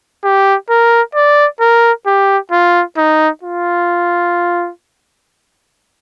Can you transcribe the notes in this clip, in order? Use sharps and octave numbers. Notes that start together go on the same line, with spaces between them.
G4
A#4
D5
A#4
G4
F4
D#4
F4